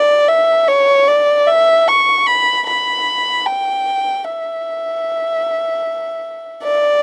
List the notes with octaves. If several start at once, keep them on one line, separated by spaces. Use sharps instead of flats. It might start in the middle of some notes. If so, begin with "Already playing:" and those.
Already playing: D5
E5
C#5
D5
E5
C#6
B5
B5
G5
E5
D5